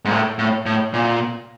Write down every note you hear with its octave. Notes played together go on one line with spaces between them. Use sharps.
G#2
A2
A2
A2
A#2